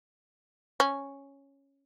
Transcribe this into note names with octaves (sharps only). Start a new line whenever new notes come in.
C#4